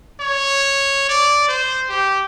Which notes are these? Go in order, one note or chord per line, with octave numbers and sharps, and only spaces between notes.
C#5
D5
C5
G4